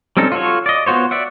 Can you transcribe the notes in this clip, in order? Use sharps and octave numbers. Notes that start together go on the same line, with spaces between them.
G3 C4 C#4 D#4 A4
F4 F#4 A4 C#5
D5 D#5
B3 F4 F#4 C5 C#5
D5 E5 F#5